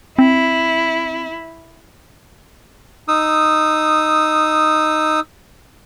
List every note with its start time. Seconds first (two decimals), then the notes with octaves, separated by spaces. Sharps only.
0.19 C4 E4
3.08 D#4 D#6 E6